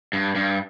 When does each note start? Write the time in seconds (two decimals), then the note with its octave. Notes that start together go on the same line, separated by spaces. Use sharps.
0.13 G2
0.35 G2